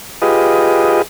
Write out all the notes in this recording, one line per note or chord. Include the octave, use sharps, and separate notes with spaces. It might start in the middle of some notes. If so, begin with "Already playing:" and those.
F4 G4 G#4 B4 D#5